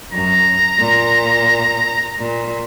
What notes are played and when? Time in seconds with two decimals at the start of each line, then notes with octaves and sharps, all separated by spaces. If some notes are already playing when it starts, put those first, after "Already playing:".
0.12 F#2 A#5
0.78 A#2
2.19 A#2